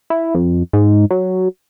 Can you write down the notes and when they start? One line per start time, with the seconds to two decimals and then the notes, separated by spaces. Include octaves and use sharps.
0.10 E4
0.35 F2
0.73 G#2
1.11 F#3